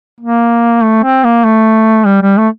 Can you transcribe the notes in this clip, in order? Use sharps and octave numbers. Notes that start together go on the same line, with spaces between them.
A#3
A3
C4
A#3
A3
G3
G3
A3